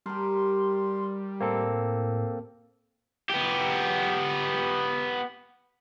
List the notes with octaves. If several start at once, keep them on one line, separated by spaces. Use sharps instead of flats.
G3 G4 A#4 C6
A2 A#3 C4 A4
B3 G4